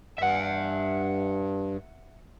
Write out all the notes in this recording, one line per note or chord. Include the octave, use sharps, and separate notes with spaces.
G2 E5 F#5